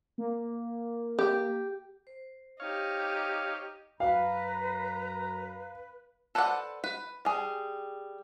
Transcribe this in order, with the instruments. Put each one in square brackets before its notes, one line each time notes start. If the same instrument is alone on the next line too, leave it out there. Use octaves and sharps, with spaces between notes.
[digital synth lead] A#3
[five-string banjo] G4
[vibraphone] C5
[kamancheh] D#4 G4 [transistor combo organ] C#5 F5
[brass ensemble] F#2 A#5 [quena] B4 [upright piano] F5
[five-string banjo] A4 B4 C5 D5 F#5
B4
G3 G#4